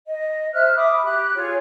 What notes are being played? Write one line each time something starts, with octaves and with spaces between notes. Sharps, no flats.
D#5
C5 E5 F6 F#6
E5 B5 D6 D#6
G4 F#6
F4 G#4 C#5